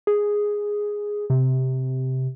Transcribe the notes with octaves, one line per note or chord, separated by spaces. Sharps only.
G#4
C3